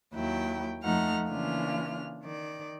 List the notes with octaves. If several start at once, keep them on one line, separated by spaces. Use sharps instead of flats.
D#2 F#3 E4 G5
F2 F3 A3 D#4 F#5 F6
C#3 E3 A#3 D4 F4 F6
D#3 D5